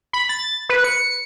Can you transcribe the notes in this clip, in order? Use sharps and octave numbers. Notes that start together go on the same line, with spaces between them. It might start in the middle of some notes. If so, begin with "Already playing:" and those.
B5
A6
B4
C#7